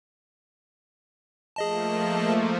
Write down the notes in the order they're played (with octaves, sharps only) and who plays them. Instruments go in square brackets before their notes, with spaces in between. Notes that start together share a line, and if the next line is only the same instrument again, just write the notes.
[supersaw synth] F3 A3 A#3 [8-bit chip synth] G#4 D#5 A5